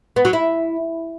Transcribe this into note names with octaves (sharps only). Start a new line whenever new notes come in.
B3
F#3
E4